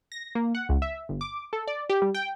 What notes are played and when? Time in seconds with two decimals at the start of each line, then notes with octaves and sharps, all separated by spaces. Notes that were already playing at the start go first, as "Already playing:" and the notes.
0.12 A#6
0.35 A#3
0.55 F#5
0.69 C#2
0.82 E5
1.09 G1
1.21 D6
1.53 A4
1.67 D5
1.90 G4
2.02 G3
2.14 G5